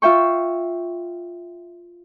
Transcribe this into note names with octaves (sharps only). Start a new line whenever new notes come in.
F4 E5 G5 C#6